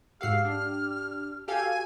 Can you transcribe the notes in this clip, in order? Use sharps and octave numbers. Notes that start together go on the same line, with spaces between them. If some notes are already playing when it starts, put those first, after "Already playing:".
G#2 F#4 G4 F5 F#5 E6 F6 C7
D4
F#4 G4 A4 F5 G#5